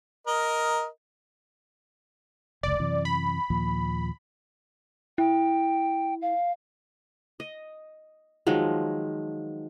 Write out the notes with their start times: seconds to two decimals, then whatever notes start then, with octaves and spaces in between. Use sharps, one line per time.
0.27 A#4 D#5
2.63 F1 C#2 D5
2.80 F#2 C3 E3
3.05 B5
3.50 D#2 A#2 F3
5.18 E4 G5
6.22 F5
7.40 D#5
8.47 D#3 F3 F#3 G#3